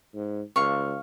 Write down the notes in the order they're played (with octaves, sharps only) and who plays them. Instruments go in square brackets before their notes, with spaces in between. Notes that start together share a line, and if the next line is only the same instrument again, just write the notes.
[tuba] G#2
[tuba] C#2 [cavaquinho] F5 C#6